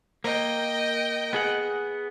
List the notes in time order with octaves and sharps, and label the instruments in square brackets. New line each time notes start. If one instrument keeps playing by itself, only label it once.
[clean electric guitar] A#3 [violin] D#5 G5
[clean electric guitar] B3 G#4 F#5